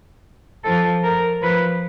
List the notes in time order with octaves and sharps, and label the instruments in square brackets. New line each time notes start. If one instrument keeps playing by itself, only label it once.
[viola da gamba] F3 [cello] A4
[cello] A#4
[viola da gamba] F3 [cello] B4